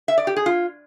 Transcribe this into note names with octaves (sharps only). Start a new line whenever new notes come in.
E5
D5
G4
G#4
F4